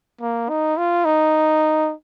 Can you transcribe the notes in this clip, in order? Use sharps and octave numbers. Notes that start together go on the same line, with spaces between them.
A#3
D#4
F4
D#4